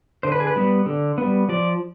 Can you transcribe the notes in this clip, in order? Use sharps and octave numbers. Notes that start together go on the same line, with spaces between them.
D3 C5
B4
G#4
B4
G3 B3
D3
G3 B3
F3 D5